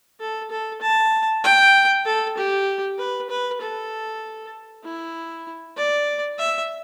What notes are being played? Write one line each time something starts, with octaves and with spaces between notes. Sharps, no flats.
A4
A4
A5
G5
A4
G4
B4
B4
A4
E4
D5
E5